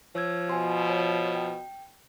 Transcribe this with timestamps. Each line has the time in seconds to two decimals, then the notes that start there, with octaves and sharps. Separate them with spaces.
0.15 F3 C#5 E6 G#6
0.49 B2 G#5 C6
0.90 C#5
1.35 G5